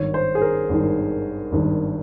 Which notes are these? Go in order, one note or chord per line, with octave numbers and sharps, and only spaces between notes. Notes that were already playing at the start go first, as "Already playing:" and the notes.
Already playing: G#1 G2 D#3 C#5
C5
G#4
A#4
G#1 G2 D#3
G#1 G2 D#3